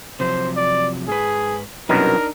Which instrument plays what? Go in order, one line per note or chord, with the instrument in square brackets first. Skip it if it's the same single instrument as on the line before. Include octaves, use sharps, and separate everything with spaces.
[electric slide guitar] C3 F3 F#3 [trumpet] C5
[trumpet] D5
[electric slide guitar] G#2 B4 [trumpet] G#4
[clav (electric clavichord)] C2 F#2 B2 [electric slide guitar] D4 D#4 [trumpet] A#4